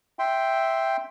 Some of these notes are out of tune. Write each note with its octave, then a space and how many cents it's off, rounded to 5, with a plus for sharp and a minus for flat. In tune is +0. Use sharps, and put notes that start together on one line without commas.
E5 +0 G5 +0 C6 +0